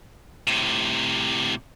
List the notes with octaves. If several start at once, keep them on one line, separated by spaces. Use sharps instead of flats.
A2 C3